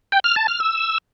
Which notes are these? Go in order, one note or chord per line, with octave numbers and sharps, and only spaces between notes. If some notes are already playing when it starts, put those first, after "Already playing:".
G5
F6
A5
F6
E6